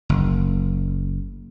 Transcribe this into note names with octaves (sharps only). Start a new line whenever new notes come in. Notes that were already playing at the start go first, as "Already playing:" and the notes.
F#1